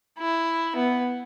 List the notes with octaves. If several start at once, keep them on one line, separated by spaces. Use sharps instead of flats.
E4
B3